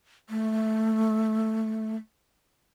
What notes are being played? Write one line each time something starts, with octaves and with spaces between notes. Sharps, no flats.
A3